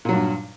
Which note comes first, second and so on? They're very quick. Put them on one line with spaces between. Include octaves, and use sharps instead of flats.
A#2 F#3 G2